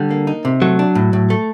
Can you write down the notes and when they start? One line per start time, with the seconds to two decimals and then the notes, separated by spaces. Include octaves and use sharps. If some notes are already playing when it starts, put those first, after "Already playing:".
Already playing: D3 G3
0.11 A#3
0.27 D#4
0.45 C3
0.61 F#3 A3
0.79 D4
0.95 A2
1.13 A2
1.30 A3